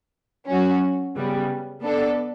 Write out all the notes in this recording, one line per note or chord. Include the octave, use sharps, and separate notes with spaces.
F#3 C#4 F#4
C#3 G3 B3
B3 D4 A4